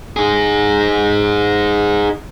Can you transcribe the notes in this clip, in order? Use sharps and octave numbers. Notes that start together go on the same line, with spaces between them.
D#4 G#4